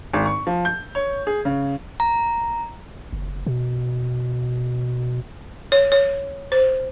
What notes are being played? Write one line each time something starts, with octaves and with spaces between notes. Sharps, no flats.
G#1
C#6
F3
G6
C#5
G#4
C#3
A#5
F#1
B2
C#5
C#5
C5